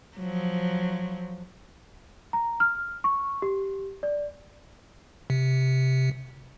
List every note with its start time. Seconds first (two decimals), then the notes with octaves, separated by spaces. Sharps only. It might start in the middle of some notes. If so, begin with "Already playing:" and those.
0.17 F3 F#3
2.33 A#5
2.60 F6
3.04 C#6
3.42 G4
4.03 D5
5.30 C3